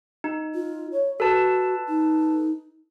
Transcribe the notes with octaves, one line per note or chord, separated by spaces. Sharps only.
D#4
F4
C#5
F#4 A4 B4 A5
D#4